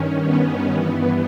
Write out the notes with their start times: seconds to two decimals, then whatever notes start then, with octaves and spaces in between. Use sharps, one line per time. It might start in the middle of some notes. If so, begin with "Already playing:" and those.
Already playing: G2 D#3 C#4
0.24 B3
0.72 G2 E3